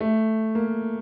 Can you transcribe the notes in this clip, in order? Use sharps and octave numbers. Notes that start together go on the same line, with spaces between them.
A3
A#3